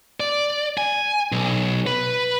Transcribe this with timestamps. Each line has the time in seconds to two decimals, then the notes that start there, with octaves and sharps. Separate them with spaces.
0.20 D5
0.78 G#5
1.32 B1
1.87 B4